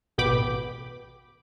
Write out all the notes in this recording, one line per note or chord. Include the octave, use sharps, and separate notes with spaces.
A1 B2 B3 G5 B5 D6